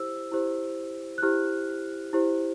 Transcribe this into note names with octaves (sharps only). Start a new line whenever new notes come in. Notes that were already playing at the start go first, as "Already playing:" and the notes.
Already playing: E4 G4 C5 E6
E4 G4 C5
F#6
E4 G4 C5 F6
E4 G4 C5